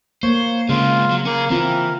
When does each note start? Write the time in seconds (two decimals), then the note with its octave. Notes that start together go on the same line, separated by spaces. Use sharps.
0.23 A#3 C5 C#5 C#6
0.69 C#3 G#3 C4 F4 F5
1.11 F#3
1.25 A#3 C#4 G#4
1.50 E3 C4 F4 A#4